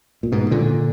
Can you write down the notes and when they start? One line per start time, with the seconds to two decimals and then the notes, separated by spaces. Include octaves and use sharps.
0.23 A#2
0.32 G#2 B2
0.51 A#2 D3